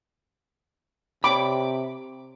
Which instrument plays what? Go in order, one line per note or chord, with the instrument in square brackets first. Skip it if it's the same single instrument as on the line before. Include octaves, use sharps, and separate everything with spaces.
[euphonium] C3 [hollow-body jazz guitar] C#5 G5 B5 [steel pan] D6